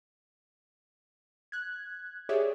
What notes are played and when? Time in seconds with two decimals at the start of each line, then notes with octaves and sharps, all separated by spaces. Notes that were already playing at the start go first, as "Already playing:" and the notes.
1.52 F#6 G#6
2.29 G4 G#4 C#5 D5 E5